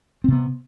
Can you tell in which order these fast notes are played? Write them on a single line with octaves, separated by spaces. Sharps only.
C4 C3 B3